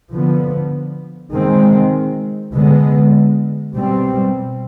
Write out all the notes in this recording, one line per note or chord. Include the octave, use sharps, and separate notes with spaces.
D3 F3 B3
D#3 G#3 C4
D3 G#3 B3
B2 G3 C4